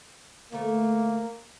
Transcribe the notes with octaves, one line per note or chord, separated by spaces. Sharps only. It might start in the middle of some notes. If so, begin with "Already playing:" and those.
D2 A3 A#3